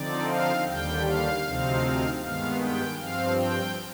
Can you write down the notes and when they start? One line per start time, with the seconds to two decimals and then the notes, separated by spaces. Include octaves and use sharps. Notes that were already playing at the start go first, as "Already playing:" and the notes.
Already playing: D3 F3 C4 D#4 D5
0.29 F5
0.67 D#2 D3 G3 G5
1.06 F5
1.45 D2 C3 F3 C4 D#4
2.22 G2 D#3 G#3 B3 F5
2.60 G5
2.98 G2 F3 C4 F5
3.37 G5